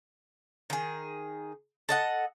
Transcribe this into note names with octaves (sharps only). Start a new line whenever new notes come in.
D#3 G#4
A4 D#5 F#5